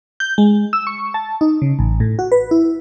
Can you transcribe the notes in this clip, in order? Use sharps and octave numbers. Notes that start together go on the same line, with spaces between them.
G6
G#3
E6
C#6
A5
D#4
C#3
A1
A2
F#4
B4
E4